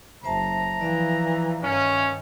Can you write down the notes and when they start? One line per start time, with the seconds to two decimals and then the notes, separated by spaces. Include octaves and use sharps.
0.24 F#1 C5 E5 A5 A#5
0.81 E3 F3 D5 E5 F5
1.63 G2 D#3 C#4